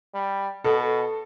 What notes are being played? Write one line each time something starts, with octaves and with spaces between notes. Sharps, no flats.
G3
B2 A4